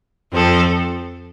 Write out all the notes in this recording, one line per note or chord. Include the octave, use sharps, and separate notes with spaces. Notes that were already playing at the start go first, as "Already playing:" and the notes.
F2 F3 C4 A4